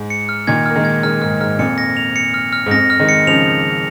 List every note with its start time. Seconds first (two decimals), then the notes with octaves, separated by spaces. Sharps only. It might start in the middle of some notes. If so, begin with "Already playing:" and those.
Already playing: G#2
0.10 C#7
0.29 F6
0.47 A#2 D#3 G#6
0.66 A#3 F6
0.75 D#3 G#3
0.85 G#6
1.03 D#3 G#3 F6
1.22 G#2 F6
1.40 G#2 F6
1.59 F2 A#2 C#7
1.78 A#6
1.97 F7
2.16 C#7
2.34 F6
2.53 F6
2.66 G#2
2.71 F2 A#6
2.90 F6
3.00 D#3 G#3
3.09 C#7
3.27 C#3 F3 F7